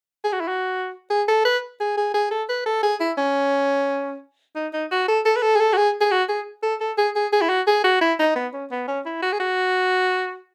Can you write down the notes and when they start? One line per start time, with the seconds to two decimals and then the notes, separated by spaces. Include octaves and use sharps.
0.24 G#4
0.32 F#4
0.40 E4
0.48 F#4
1.10 G#4
1.28 A4
1.45 B4
1.80 G#4
1.97 G#4
2.14 G#4
2.31 A4
2.49 B4
2.66 A4
2.83 G#4
3.00 E4
3.17 C#4
4.55 D#4
4.73 D#4
4.91 F#4
5.08 A4
5.25 A4
5.36 B4
5.42 A4
5.55 G#4
5.60 A4
5.73 F#4
5.77 G#4
6.01 G#4
6.11 F#4
6.29 G#4
6.63 A4
6.80 A4
6.98 G#4
7.16 G#4
7.32 G#4
7.41 E4
7.49 F#4
7.67 G#4
7.84 F#4
8.01 E4
8.19 D#4
8.35 B3
8.53 C#4
8.71 B3
8.88 C#4
9.05 E4
9.22 F#4
9.32 G#4
9.40 F#4